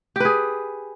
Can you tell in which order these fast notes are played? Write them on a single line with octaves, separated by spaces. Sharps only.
G4 B4 G#4